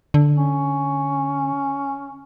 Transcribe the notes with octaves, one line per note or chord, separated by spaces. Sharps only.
D3
C#4